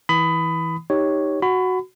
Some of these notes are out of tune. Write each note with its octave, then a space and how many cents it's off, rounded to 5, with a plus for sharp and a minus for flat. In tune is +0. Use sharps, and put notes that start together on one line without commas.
E3 -20 B5 +20 D#6 +0
D#4 +0 G4 +0 C#5 +0
F#4 +0 B5 +30